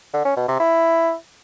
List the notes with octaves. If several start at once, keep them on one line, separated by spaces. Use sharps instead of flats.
D3
C#4
B2
C3
E4